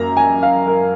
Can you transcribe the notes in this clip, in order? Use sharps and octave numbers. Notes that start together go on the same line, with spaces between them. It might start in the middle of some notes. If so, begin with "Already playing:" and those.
Already playing: F#2 A#3 A#5
G#5
F5
A#4